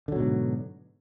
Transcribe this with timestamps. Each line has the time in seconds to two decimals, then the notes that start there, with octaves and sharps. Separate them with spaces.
0.08 D3
0.12 F#3
0.16 B2
0.20 G#2